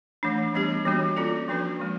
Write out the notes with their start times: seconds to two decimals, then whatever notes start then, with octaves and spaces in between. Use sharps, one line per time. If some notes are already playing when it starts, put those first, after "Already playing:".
0.23 E3 A3 D4
0.54 E3 G3 B3 D4 G4
0.86 E3 G3 A#3 D4 F#4
1.16 C#4 F4 A4 D5
1.48 F3 A#3 D4 F#4 B4
1.79 F3 G#3